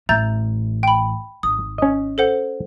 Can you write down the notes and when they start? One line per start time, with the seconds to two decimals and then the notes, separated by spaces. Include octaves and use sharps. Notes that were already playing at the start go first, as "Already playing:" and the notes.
0.09 A1 A3 E5 A#5 G6 A6
0.83 G5 B5
1.43 G#1 D#6
1.78 C#4 D#5
2.18 A4 C5 F#5